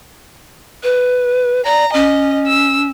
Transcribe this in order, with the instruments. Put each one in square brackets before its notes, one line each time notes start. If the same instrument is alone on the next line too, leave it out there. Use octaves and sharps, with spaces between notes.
[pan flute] B4
[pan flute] D5 [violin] A#5
[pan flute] C#4 [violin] D#5
[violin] E6